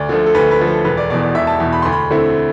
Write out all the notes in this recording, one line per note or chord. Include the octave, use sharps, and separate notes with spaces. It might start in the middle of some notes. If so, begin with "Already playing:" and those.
Already playing: D2 D5
D3 F3 A3
A4
D2 B4
B4
D3 F3 A3
A4
E1 B4
D5
E2 B2 D5
D5
E1 E5
A5
E2 B2
B5
D2 C6
B5
D3 A3 C4 E4